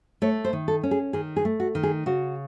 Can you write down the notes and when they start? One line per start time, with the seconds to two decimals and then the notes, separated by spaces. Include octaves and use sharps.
0.22 A3 C#5
0.45 C5
0.53 D#3
0.68 A4
0.83 C#4
0.91 G#4
1.13 D#3 G#4
1.36 G#4
1.45 A3
1.60 F#4
1.75 D#3
1.83 G#4
2.06 C#3 F#4